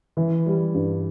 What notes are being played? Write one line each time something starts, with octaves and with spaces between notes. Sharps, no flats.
E3
G3
G2